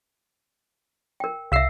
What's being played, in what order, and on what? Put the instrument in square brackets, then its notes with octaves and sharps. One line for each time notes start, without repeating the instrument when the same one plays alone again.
[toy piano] A#4 G5
[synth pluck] C2 E6 C7 [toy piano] E5 F5